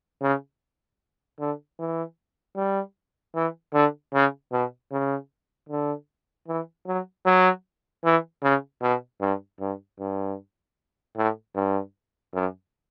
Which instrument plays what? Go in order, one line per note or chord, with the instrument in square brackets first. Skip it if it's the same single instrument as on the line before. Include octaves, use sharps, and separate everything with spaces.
[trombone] C#3
D3
E3
G3
E3
D3
C#3
B2
C#3
D3
E3
F#3
F#3
E3
C#3
B2
G2
G2
G2
A2
G2
F#2